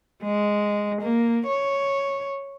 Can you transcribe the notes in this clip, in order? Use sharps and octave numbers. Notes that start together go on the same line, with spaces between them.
G#3
A#3
C#5